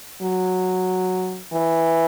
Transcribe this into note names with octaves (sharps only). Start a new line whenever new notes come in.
F#3
E3